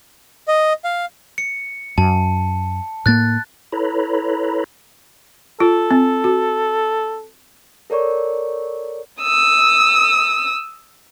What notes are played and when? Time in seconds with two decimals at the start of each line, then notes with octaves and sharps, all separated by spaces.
0.48 D#5
0.84 F5
1.38 C#7
1.98 F#2 A5
3.06 A2 A#3 F#6 A6
3.72 E4 A4 B4 C#5 A#5 B5
5.60 F4 A4
5.91 C4
6.24 F#4
7.90 A4 A#4 C#5 D5 C#6
9.22 D#6 E6